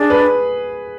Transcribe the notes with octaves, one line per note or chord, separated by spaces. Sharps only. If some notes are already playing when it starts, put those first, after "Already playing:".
Already playing: D4 G#4
B4